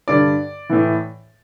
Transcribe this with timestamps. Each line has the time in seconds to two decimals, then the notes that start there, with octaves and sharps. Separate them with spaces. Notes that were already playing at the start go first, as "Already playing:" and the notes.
0.08 G2 D3 D5
0.70 A2 E3